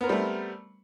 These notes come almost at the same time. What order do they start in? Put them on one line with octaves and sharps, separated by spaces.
B3 A#4 C4 G3 A3